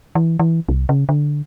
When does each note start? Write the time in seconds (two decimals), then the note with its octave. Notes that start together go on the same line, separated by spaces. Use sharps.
0.15 E3
0.39 E3
0.69 C2
0.89 C#3
1.09 D3